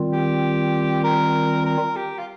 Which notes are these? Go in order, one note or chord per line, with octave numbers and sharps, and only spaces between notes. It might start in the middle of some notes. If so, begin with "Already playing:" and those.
Already playing: D#3 G3 C4 F4
G4
A#4
A#4
G4
F4